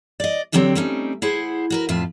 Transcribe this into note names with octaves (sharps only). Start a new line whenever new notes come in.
D5 D#5
D3 F#3 C4 D4 G4 G5
G3 A3 C4 C#4 D#4
E4 G#4 C5 F#5
F#4 A#4 B4
F2 A2 F4 E5